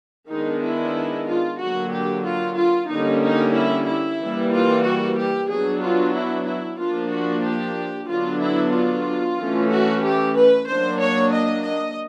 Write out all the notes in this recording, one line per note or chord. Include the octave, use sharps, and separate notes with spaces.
D#3 G#3 B3 D4 D#4
E4
F4
D3 F#3 A#3 F#4
G4
F4
F4
D3 G3 A#3 C#4 D#4
D#4
E4
E4
E3 G3 A#3
F4
F#4
G4
F#3 B3 D4 G#4
F4
E4
E4
F3 A#3 D4 F4
F#4
G4
D3 F#3 B3 D4 F4
E4
F4
E3 A3 C#4
F#4
G4
B4
F#3 A#3 D4 C5
C#5
D#5
D#5